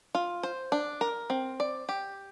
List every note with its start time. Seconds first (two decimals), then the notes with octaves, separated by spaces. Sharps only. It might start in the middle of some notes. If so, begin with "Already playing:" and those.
0.15 F4
0.43 C5
0.72 D4
1.01 A#4
1.30 C4
1.60 D5
1.89 G4